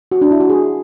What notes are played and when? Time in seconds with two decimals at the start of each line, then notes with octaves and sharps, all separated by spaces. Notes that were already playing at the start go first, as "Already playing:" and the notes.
0.12 F#4
0.21 D4
0.31 E4
0.40 F#4
0.50 G#4